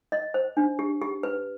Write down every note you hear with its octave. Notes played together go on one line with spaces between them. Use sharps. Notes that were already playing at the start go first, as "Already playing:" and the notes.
D#5
C5
D4
G4
G4
B4